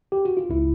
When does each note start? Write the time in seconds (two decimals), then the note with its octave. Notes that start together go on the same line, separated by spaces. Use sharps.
0.12 G4
0.25 F#4
0.37 F4
0.50 C#2 E4